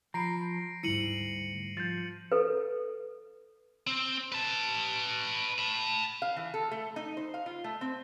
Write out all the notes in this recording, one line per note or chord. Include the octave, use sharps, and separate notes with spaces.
F3 A#5 B5 A#6 C7 D7
D2 G#2 G3 E4 C#7 D#7 F#7
F3 G6 A6
A4 B4
C4
B4 A5
A5 B5
F5
E3
A4
A3
D#4
C5
F5
F4
A3
C4